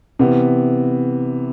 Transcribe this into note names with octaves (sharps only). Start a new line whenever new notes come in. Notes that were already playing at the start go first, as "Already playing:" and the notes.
C3 E3 B3